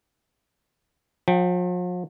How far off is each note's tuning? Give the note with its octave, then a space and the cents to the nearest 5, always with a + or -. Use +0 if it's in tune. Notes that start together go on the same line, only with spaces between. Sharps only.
F3 +45 G5 -5